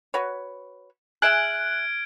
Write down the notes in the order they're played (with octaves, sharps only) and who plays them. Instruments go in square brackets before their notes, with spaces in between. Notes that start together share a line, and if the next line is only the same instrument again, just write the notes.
[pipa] F#4 B4 C#5
[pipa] G#4 E5 G#5 [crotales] F6 G#6 D7 [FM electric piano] F#6